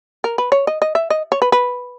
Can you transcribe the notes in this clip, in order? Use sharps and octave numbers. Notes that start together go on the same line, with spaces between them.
A#4
B4
C#5
D#5
D#5
E5
D#5
C#5
B4
B4